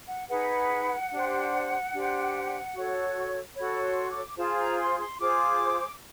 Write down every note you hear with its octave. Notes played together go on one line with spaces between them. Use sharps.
F#5
D#4 G#4 B4 F#5
D4 G4 C5
D4 G4 C5
F#4 A4 C#5
F#4 A4 C#5 B5
C6
D6
F4 G#4 C5 A5
A#5
C6
C6
F4 G#4 C5 D6